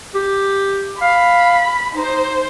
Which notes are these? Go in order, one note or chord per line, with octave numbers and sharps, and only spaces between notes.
G4
F5 B5
D#4 C5